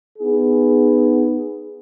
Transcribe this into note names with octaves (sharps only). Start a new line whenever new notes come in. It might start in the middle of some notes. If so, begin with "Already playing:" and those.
B3 D#4 G#4